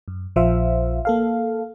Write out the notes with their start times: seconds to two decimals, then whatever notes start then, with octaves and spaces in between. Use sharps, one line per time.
0.08 F#2
0.36 A#1 F3 C5 E5 F5
1.05 A#3 A4 F5